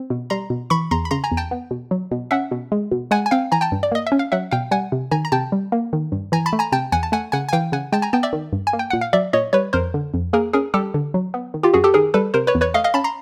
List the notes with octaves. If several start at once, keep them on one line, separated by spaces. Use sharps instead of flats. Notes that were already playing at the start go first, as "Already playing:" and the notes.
Already playing: C4
B2
G3 A#5 C6
B2
E3 B5 C#6
E2 A#5 C6
B5
C#3 A#5 C6
G#5 A#5
E2
G5 A5
B3
B2
F#3
B2
C#4 E5 F#5
B2
G#3
B2
G#3 F#5 G#5
G#5
C4 F5 G5
E3 G#5 A#5
G5 A5
G2
D5
A#3 D#5
E5
C#4
F5
F#3 E5 F#5
B2 F5 G5
G3 F#5 G#5
C3
D#3 G#5 A#5
A#5
C3 G5 A5
G3
A#3
D#3
G2
E3 G#5 A#5
A5 B5
A3
G#5 A#5
C3 G5 A5
E2 F#5 G#5
A5
A3 F#5 G#5
C#3 F#5 G#5
G#5
E3 F5 G5
C#3 F#5 G#5
G#3 G5 A5
G#5 A#5
B3 G5 A5
D5 E5
D#3
G2
G#5
A#3
G5
A#2 F#5
F5
F#3 D5 E5
A#2 C#5 D#5
G3 B4 C#5
F2 A#4 C5
D3
F2
A#3 G#4 A#4
C#4 G#4 A#4
G3 G4 A4
D3
F#3
B3
D#3
F4 G4
F#2 F#4 G#4
G4 A4
D#3 G#4 A#4
G3 A4 B4
C3 A#4 C5
B4 C#5
E2
B4 C#5
A3 D#5 F5
D#5 F5
C#4 A5 B5
A#5 C6